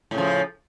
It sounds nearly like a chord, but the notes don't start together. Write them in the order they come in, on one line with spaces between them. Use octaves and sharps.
A2 C#3 F3